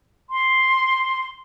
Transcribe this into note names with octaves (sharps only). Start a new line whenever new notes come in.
C6